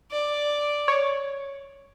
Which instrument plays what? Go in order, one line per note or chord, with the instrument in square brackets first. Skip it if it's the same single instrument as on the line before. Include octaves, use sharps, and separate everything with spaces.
[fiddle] D5
[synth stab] C#5